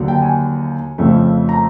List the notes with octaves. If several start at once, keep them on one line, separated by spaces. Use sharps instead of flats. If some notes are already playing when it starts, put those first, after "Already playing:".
Already playing: D#2 D3 F#3
G5
G#5
F2 C#3 F3 A3
A#5